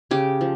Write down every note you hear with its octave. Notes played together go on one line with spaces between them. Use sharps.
C#3 G4
F3